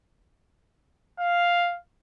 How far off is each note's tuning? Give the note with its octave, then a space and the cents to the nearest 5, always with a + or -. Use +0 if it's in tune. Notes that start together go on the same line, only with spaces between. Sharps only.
F5 +0